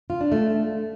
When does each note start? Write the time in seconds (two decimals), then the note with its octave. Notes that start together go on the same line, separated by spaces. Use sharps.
0.10 F4
0.21 D4
0.32 A3